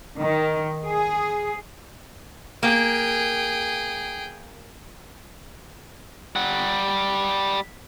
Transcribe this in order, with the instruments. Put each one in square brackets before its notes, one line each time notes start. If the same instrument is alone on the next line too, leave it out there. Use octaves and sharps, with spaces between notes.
[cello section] D#3
G#4
[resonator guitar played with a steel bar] A#3 [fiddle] G#4 G5
[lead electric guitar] G3 F#5